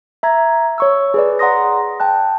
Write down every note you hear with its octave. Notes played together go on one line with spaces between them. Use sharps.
E5 A#5 G#6
C#5 C#6 E6
G#4 B4 D5
D5 F#5 A#5 C6 D#6 A#6
G5 A5 F#6